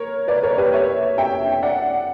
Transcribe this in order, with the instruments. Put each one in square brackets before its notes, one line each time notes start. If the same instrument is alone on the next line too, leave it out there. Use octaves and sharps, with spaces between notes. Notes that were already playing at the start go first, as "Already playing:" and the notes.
Already playing: [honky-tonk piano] A#4 C#5
B4 D5
A#4 C#5
G4 B4
C#5 E5
E5 G5
D5 F#5